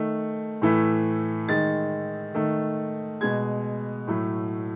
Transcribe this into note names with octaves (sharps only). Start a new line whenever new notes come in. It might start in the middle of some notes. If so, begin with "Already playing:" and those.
Already playing: D#3 A3
A2 E3 A3
D#3 G#3 A6
D#3 A3
B2 G#3 G#6
A2 F#3 A3